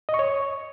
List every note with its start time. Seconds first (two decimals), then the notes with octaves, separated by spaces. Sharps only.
0.09 D#5
0.14 C#6
0.19 C#5